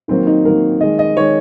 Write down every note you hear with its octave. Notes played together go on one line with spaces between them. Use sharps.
D#3 F#3 A#3 C4
D#4
D#3 F#3 A#3 A#4
D#3 G#3 D#5
D#5
D#3 G#3 C#5